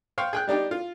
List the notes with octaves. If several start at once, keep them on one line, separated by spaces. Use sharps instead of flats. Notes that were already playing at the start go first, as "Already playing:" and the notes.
C5 F5 G5 C6 C#6
G#4 G5 F#6
G3 D4 D#4 G4
F4